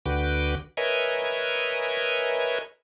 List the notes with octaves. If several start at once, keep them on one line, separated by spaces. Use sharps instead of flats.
D2 D3 F#4 B4 G5 D6
A#4 B4 C#5 D#5 E5 G#5